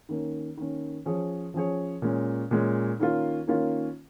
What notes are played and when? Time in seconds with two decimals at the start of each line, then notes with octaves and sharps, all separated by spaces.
0.09 D#3 A#3 C#4
0.57 D#3 A#3 C#4
1.06 F3 C#4 G#4 C#5
1.54 F3 C#4 G#4 C#5
2.02 A#2 G#3 C#4
2.51 A#2 G#3 C#4
2.99 D#3 A#3 C#4 F4
3.47 D#3 A#3 C#4 F4